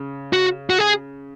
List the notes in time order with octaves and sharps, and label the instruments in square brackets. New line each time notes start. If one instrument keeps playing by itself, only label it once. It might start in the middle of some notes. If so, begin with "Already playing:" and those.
Already playing: [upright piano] C#3
[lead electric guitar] F#4
F#4
G#4